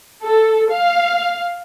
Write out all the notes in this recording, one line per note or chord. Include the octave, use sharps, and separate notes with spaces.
A4
F5